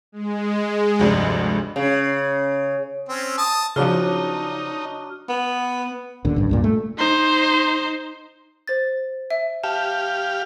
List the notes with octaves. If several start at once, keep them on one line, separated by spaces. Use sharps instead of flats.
G#3
F1 D2 G2
C#3
C4 C#4
A5 D#6
C#3 F3 F#3 D4 D#4 F6
B3
D#2 A#2 D3
A1 G2
C#2 G2 A#2
A3
D#4 C5
C5 A6
E5
G4 F5 A5